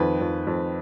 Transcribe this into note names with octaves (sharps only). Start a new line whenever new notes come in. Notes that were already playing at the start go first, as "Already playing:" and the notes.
Already playing: F2 D#3 B4
F2
F2